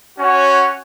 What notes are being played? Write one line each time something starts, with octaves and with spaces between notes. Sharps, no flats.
C#4 F#4 C#5 F#5